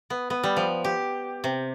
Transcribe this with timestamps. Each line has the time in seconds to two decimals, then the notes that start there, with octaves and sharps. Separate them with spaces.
0.10 B3
0.30 B3
0.43 G3
0.57 F3
0.84 G4
1.44 C3